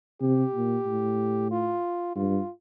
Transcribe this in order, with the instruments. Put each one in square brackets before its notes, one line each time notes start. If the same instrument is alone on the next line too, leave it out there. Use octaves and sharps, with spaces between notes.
[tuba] C3 [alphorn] G4
[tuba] A#2
A2
[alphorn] F4
[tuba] G2 [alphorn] F4